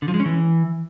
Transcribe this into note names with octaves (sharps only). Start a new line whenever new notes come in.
D3
F3
G#3
C#4
E3